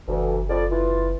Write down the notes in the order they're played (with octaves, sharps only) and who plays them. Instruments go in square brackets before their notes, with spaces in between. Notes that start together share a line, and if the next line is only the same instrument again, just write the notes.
[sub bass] F#1 [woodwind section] D2 E3
[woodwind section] F2 D5
E3 F4